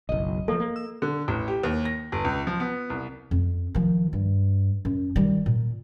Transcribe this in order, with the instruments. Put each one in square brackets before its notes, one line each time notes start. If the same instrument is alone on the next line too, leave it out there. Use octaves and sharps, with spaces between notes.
[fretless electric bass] F#1 B1 [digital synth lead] D#5
[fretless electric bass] F3 A#3 [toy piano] A4
[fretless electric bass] A#3
[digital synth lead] E6
[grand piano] D3
A1
G4
D#2
A#6
G1
C#2
F3
B3
C2
[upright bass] F2
D#3 F3
G2
F#2
D#3 G3
A#2